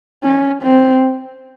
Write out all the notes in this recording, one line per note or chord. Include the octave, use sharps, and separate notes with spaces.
C#4
C4